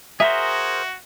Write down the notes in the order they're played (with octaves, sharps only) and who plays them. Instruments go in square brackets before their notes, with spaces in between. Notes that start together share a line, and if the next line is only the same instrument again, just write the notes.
[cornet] F#4 [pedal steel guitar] G#4 A#4 C5 [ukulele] E5